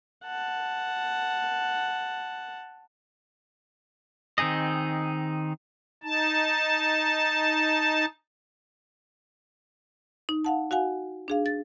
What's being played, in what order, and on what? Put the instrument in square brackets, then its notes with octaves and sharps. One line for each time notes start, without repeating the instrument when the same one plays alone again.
[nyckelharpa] F#5 A5
[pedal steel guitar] D#3 C4 D#4 G#4 D#5
[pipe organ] D#4 A5
[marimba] D#4
F5 F#5 A5
F#4 F5 F#5 G#5
D4 G#4 F5
A6